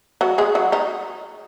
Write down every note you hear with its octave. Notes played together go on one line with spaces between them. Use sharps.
F#3 F#4
G#3 G#4
F#3 F#4
D#3 D#4